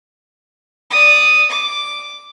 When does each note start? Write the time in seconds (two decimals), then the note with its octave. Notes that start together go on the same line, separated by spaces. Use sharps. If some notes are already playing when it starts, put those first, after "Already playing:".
0.91 D5 D#6
1.51 D6